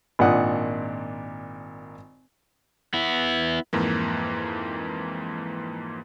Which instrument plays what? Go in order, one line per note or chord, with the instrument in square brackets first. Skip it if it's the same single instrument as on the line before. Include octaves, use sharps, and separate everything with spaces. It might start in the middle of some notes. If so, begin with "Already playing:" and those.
[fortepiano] G#1 A#2 D4 F#5 D#6
[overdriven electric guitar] B3 E4
[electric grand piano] F2 G#2 E3 A#3